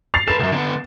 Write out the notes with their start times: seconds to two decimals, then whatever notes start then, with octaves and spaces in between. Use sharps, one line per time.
0.14 A6 C7 F7
0.28 A4 B4 E7
0.39 C2 F#2
0.52 D3 B3